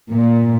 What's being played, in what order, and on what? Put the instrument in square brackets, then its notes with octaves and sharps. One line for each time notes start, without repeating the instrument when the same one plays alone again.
[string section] A#2